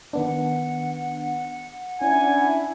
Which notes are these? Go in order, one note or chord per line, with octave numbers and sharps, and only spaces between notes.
D#3 B3 D4 F#5
C#4 D4 E4 G#5